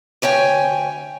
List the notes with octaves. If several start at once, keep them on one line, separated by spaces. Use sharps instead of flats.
D2 C#5 G5 G#5